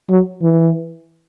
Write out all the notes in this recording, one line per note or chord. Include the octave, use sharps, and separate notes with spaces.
F#3
E3